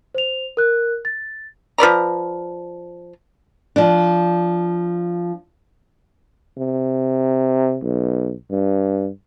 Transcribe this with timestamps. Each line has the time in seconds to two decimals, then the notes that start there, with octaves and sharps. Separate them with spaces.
0.15 C5 F7
0.57 A#4 F#6
1.05 A6
1.78 F3 B4 D5 A#5
3.76 F3 D4
6.58 C3
7.83 B1
8.51 G2